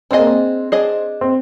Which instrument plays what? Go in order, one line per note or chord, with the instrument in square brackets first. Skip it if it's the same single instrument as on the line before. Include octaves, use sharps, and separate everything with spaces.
[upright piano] C4 [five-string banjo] D4 G#4 D#5
[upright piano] A#3
C4
[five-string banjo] D4 G#4 D#5
[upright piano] C4